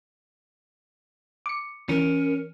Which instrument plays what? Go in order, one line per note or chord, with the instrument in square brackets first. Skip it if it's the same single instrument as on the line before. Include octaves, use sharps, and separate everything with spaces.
[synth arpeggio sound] D6 C#7
[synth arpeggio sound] E3 [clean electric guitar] C#4 [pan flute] A#4